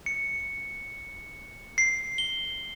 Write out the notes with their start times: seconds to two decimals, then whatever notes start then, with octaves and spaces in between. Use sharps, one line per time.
0.06 C#7
1.78 C7
2.18 G7